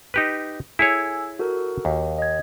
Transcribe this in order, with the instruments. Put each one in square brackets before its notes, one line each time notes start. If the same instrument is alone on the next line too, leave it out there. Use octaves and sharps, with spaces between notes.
[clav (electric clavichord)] D#4 G4 B4
[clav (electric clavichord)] E4 G#4 C#5 [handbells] A4 G#5 E6
[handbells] F#4 A4 A#4
[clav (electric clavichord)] D#2
[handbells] D#5 G#6